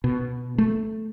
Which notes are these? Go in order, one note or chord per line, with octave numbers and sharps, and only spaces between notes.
B2
A3